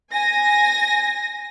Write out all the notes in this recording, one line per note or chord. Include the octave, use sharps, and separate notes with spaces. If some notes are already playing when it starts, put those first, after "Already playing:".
G#5 A#6